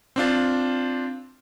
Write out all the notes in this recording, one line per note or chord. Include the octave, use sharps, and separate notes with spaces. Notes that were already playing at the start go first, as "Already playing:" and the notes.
C4 D4 F4